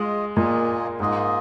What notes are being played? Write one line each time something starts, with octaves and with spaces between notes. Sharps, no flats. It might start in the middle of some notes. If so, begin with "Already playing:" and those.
Already playing: G#3 F4 D#5
A#2 A#3 F4 G#4 D#5
G#2 A#3 F4 G#4 D#5